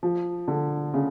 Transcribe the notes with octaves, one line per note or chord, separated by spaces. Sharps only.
F3
D3
C#3